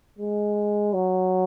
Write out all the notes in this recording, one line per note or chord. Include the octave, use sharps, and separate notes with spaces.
G#3
F#3